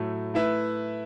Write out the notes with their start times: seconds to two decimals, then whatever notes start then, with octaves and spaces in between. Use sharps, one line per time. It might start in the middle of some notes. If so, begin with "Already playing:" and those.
Already playing: A2 F#3 A3
0.34 A3 E4 B4 E5